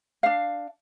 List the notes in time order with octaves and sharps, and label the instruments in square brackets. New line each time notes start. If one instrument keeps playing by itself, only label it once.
[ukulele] D4 F5